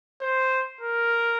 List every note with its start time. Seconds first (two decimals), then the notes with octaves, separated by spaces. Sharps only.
0.21 C5
0.81 A#4